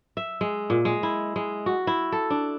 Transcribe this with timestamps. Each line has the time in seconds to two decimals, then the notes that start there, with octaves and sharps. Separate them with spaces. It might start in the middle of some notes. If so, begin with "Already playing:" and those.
0.17 E5
0.41 G#3
0.70 A#2
0.85 G#3
1.03 E4
1.36 G#3
1.66 F#4
1.87 E4
2.12 A4
2.30 D4